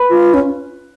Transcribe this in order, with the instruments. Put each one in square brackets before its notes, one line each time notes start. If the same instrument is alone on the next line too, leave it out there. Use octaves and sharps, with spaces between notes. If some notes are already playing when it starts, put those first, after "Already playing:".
Already playing: [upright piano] B4 B5
[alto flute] F4
C#4